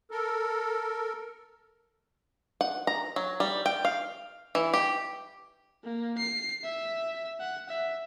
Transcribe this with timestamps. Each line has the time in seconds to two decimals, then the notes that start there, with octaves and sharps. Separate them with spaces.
0.11 A4 A#4
2.61 F#5
2.87 A#5
3.16 F#3
3.40 G3
3.66 G5
3.85 F5
4.55 E3
4.74 G4
5.84 A#3
6.18 C7
6.64 E5
7.40 F#5
7.69 E5